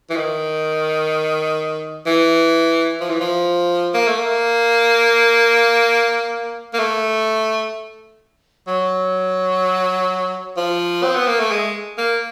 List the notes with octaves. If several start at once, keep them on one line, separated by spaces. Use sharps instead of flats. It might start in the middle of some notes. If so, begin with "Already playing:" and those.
E3
D#3
E3
F3
E3
F3
A#3
A3
A#3
A#3
A3
F#3
F3
C4
B3
A#3
A3
G#3
A#3